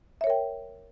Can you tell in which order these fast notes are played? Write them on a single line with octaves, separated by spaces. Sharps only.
E5 C#5 A#4 G5